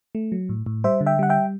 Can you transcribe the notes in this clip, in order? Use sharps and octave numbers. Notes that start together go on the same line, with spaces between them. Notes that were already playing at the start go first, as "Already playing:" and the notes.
A3
F#3
A2
A2
G3 C5 E5
D3
E5 G5
G3 F#5
E5 G5